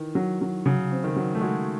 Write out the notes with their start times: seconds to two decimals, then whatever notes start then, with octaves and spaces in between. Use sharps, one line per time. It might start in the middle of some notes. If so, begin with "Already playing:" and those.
Already playing: D#3 E3
0.15 F#3
0.41 F#3
0.66 C#3 F#3
0.92 C4
1.04 D#3
1.16 F#3
1.35 A3
1.41 G#3 F#4